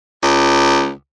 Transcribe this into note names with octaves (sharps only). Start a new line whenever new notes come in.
C#2